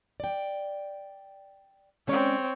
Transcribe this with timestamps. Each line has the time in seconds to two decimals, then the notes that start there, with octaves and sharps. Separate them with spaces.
0.20 D5 G5
2.08 G#3 C4 C#4 C#5 D5